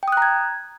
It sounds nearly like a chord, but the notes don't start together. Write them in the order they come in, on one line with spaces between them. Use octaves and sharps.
G5 D#6 F#6 A#5 G#6